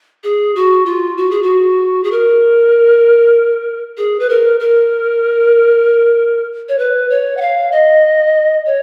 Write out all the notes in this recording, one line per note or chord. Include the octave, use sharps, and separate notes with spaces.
G#4
F#4
F4
F#4
G#4
F#4
G#4
A#4
G#4
B4
A#4
A#4
C#5
B4
C#5
F#5
F5
D#5
C#5